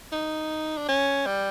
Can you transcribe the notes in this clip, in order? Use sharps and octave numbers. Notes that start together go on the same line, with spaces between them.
D#4
D4
C#4
G3